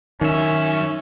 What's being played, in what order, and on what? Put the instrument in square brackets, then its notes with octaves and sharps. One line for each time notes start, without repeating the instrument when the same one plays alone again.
[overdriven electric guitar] F#2 E5 [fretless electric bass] D#3 [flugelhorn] C#4